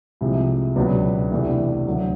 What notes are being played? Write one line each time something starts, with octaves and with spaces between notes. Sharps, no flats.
C2 C3 F3 G#3
C#2 B2 F#3 B3 D4
E2 C3 E3 A3 D4
D2 D3 F#3